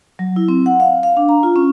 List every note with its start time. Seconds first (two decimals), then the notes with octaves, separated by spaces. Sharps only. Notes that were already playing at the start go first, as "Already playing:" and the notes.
0.19 F#3
0.36 E4
0.48 C4
0.66 F#5
0.80 F5
1.03 F5
1.17 D4
1.29 A#5
1.43 F4
1.56 C#4